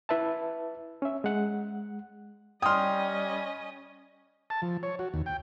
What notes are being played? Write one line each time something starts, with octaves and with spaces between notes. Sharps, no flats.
E4 B4 E5 A5
C#4 E5
G#3 F#5
G3 C#4 D#5 G5 C6 D#6 F6
A5
F3
C#5
F#4
D#2
G5